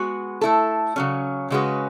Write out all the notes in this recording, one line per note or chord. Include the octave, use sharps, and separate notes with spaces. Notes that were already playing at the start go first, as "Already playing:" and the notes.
Already playing: G#3 B3 F#4
A3 E4 A4
C#3 F#3 C#4
C#3 G#3 C#4 F#4 B4